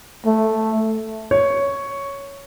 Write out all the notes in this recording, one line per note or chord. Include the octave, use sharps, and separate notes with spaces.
A3
C#5